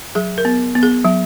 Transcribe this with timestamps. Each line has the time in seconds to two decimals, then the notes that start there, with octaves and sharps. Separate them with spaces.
0.15 F#3 G#4
0.38 A#4
0.45 B3
0.75 B3
0.83 G#4
1.05 F#3